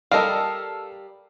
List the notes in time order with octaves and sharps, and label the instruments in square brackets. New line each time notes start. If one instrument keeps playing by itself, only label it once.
[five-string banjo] G3 A#4 [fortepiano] A4 D#5 F5